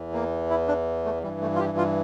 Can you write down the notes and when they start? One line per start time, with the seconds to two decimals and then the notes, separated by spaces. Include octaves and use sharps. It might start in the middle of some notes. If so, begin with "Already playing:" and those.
Already playing: E2 E3
0.13 A#3
0.50 E4
0.68 D4
1.05 A3
1.23 E3 G3
1.27 G2
1.41 A3
1.55 F4
1.60 G4
1.78 F4